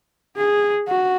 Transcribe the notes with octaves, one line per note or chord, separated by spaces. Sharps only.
G#4
F#4